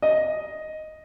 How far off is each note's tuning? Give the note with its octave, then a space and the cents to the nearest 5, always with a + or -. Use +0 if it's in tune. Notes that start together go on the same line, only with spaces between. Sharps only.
D#5 +0